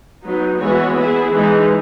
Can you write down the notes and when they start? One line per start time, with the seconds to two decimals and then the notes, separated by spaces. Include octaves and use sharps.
0.24 F#3 B3 D#4
0.60 E3 G#3 B3 F#4 C#5
0.97 B3 E4 G#4
1.32 E3 G#3 D#4